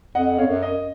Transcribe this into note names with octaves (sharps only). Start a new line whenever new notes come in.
F2 D#5 F#5
F2 C#5 F5
F#2
D#5